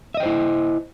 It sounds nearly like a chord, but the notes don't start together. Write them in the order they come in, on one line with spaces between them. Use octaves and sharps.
E5 D#5 G5 C5 E4